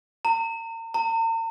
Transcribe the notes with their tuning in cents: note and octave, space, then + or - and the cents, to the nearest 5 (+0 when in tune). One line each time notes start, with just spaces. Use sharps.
A#5 -40
A#5 -45